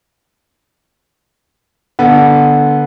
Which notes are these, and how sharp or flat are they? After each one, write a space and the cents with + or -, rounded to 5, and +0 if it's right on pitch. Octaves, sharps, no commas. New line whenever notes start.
D3 +0 B3 -15